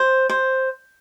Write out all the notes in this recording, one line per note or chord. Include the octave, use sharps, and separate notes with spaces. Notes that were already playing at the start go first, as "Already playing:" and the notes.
Already playing: C5
C5